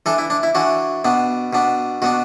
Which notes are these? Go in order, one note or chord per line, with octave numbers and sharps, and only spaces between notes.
E3 D4 A4
E4
D4
E4
E3 D4 F#4
B2 B3 D4
B2 B3 D4
B2 B3 D4 F#4